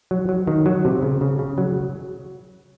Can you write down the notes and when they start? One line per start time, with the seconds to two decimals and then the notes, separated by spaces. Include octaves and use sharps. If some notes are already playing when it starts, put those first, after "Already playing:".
0.11 F#3
0.29 F#3
0.47 D#3
0.66 F#3
0.85 C3
1.02 C#3
1.21 C#3
1.39 C#3
1.58 F#3